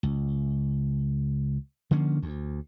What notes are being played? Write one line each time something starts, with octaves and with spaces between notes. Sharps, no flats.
C#2
D3 F3 A#3 C#4
D2